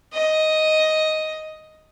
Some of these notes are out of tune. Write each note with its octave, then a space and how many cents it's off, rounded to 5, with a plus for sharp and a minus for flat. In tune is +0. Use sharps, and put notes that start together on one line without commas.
D#5 +5